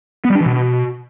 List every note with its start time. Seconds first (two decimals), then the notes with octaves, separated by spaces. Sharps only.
0.25 B3
0.30 G3
0.35 D4
0.41 E3
0.46 B2